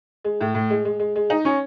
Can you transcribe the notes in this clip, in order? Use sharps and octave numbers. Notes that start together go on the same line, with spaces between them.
G#3
A2
A2
G#3
G#3
G#3
G#3
D#4
C#4